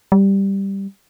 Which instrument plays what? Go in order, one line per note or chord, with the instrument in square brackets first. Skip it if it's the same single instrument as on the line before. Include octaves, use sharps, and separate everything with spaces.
[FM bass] G3